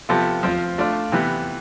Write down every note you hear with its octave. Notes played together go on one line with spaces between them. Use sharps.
C3 F3 B3 F4 A4
F3 C4 F4
A3 D4 F4
C3 E3 B3